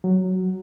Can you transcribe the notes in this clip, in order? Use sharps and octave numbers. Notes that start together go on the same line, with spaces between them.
F#3